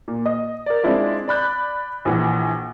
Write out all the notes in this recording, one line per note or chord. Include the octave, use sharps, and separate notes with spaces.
A#2
D#5
A#4 D5
G#3 C4 D4 E4 F4
D5 B5 F#6 G6
A#1 E3 F#5